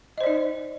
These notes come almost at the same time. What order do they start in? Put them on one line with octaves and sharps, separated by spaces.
D#5 C5 D5 D#4